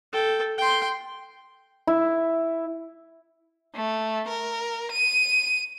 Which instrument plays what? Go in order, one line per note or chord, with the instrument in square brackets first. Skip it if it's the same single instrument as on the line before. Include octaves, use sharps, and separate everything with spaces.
[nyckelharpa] A4 G5
G5 C6
[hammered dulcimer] E4
[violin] A3
A#4
D#7